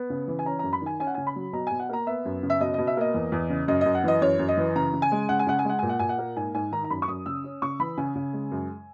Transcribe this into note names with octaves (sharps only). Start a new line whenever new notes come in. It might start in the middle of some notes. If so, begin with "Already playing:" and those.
Already playing: B3
C#3
E3
G#5
C#4 A#5
F#2 A#5
B5
D#3 G#5
C#4 G#5
F#5
C#3 G#5
B5
F#3
B2 A#5
B2 G#5
F#5
A#3 A#5
B3 E5
F#2
C#3
E5
B2 D#5
B2 D#5
E5
A#3 D#5
E2
E2
C#3
F#2 D#5
F#2 D#5
F#5
E3 D#5
F#2 C#5
F#2
D#5
E3
C#3 A#5
C#3
G#5
G#3
C#3 F#5
G#5
C#3 F#5
G#5
G#3 F#5
A#2 G#5
F#5
A#2 G#5
F#5
A#3
G#2 G#5
G#2 G#5
D#3 A#5
A#5
F#2 B5
C#6
F#2 D#6
C#3 E6
C#4
C#3 C#6
E3 B5
C#3 G#5
C#3
G#3
F#2